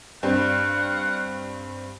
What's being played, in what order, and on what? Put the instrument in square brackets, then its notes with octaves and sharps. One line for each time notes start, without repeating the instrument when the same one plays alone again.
[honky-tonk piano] G2 C4 [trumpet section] F5 F#5